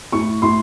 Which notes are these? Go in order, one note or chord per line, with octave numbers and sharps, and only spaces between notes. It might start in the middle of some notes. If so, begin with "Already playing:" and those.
A2 C#6
A2 C6